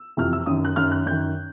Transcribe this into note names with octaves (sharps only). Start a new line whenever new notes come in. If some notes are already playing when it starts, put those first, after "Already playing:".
Already playing: E6
F2 C3 E3 F6
E6
F#2 D#3 D#6
F#6
F#2 D#3 F6
F#6
F#2 D#3 G6